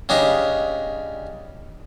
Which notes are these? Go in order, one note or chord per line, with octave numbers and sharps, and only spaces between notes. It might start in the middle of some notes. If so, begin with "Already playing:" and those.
C#3 G3 D4 D#4